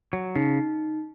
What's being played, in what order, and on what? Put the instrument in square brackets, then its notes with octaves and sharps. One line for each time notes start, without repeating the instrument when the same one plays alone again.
[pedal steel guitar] F#3
[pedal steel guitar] C#3 [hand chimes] D#4